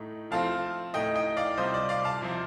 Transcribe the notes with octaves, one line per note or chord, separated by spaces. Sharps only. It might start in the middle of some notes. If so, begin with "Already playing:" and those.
Already playing: A2 A3 D#4
F3 A3 C4 F4 F5 A5
A2 A3 D#4 D#5 G5
D#5 G5
D5 F5
C3 G3 C4 F4 C5 D#5
D5
D5 F5
F5 A5
C3 F3 C4